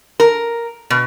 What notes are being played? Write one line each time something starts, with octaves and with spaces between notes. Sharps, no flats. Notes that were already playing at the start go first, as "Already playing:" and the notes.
A#4
B2